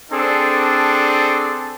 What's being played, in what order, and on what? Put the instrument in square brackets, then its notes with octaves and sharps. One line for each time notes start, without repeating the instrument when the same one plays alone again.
[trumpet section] C4 D4 G#4 A4